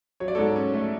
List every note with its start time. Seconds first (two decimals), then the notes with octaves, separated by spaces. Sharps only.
0.20 F#3 C#5
0.28 D5
0.35 G#2 A4 C#5
0.56 C#4
0.74 A3